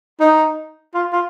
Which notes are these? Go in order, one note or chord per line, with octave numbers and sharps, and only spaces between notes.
D#4
F4
F4